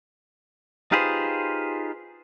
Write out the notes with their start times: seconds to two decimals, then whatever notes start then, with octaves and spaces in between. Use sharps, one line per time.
0.92 D#4 F4 G4 G#4 B4 C5